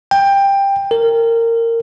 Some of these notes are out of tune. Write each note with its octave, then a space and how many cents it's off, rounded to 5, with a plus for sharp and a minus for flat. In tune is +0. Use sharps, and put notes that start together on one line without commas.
G5 +15
A#4 -20